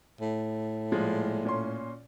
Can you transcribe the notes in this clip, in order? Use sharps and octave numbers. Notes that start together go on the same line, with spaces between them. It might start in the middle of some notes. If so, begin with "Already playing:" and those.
A2
A#2 F3 G#3
A#2 C#4 C6